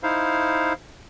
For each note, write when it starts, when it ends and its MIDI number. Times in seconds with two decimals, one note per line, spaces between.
0.03 0.73 63
0.03 0.73 64
0.03 0.73 72
0.03 0.73 77